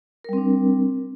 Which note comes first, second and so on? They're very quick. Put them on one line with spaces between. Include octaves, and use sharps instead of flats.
A#4 G3 C4 D4